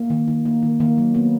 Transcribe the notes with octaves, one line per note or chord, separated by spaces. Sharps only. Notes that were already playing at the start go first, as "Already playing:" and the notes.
Already playing: A#3
D#3
D#3
A#3
D#3
D#3 A#3
F#3
A#3 B3